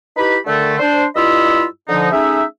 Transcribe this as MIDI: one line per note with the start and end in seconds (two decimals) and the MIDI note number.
0.17 0.37 63
0.17 0.37 64
0.17 0.37 67
0.17 0.37 71
0.17 0.37 83
0.47 0.75 50
0.47 0.75 51
0.47 0.75 57
0.80 1.04 62
0.80 1.04 72
1.16 1.64 43
1.16 1.64 64
1.16 1.64 65
1.16 1.64 75
1.16 1.64 83
1.16 1.64 88
1.89 2.11 50
1.89 2.11 53
1.89 2.11 63
2.12 2.43 57
2.12 2.43 61
2.12 2.43 63
2.12 2.43 68
2.12 2.43 76